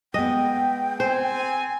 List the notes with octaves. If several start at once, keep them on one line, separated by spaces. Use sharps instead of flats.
G#3 B3 D#5 G5
C4 C5 G#5